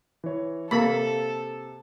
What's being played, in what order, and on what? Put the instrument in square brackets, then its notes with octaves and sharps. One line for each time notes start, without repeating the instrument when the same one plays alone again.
[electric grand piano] E3 C#5
[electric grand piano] C3 [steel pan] A#3 B5 [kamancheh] A4